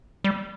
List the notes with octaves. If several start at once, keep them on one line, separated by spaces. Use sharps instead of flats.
G3